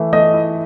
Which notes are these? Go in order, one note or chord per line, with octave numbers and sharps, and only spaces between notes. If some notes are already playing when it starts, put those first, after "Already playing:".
Already playing: E3 A3
A3 D#5
E4